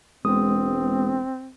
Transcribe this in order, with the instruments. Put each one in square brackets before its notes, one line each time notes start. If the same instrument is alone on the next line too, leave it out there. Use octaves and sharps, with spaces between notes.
[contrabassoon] E1 [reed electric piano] G#3 B3 D#6 [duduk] C4